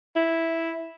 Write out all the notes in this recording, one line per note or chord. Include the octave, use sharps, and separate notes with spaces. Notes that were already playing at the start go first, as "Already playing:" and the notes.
E4